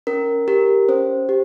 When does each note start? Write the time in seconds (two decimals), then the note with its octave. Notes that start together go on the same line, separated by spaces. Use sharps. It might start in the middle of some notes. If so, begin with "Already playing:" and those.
0.07 C#4 A#4
0.48 G4 A#4
0.89 C#4 C5
1.29 G4